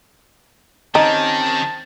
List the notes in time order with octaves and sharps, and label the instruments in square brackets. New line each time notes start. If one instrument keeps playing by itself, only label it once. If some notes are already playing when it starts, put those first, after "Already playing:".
[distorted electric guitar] D#3 [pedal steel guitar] C4 C#4 G4 [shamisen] D#4 [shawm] A5